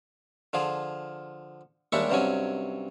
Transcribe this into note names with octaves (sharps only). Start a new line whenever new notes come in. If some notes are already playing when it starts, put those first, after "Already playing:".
D3 F3 F4 G#4
D#2 G3 G#3 D4 E5 C#6
G2 C3 F#3 C#4 G#5